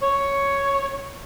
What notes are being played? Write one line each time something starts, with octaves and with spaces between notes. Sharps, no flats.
C#5